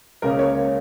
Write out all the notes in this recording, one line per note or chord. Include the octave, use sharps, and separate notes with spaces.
C#2 C#3 A#3 C#4 A#4
C#5
C#5